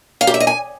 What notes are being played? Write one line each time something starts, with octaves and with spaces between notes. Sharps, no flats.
F5
G4
E5
D#5
G#5